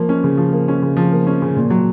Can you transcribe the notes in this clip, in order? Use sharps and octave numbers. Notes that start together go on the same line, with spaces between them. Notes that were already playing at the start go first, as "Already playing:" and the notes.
Already playing: F3 A#3
C#4
C#3
F3
A#3
C#4
C#3
F3
A#3
C#4
C#3
A#2
F#3